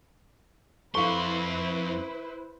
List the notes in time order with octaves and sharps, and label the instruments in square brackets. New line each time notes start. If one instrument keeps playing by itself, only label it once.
[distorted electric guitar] F2 C6 [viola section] E4 B4 C5 [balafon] A4 F5 [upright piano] C#6